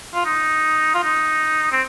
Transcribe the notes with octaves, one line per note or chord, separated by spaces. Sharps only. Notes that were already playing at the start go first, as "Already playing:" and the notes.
F4
D#4
F4
D#4
C4